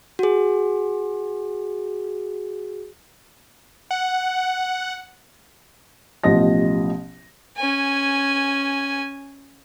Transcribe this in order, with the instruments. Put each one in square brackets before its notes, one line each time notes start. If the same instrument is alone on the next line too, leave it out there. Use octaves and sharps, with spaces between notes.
[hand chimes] F#4 G#4
[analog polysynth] F#5
[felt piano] A1 B2 F3 G4 D#5 A#6
[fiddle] C#4 G#5